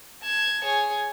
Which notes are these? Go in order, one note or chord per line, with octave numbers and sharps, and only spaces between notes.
A5 G#6
G#4 C#5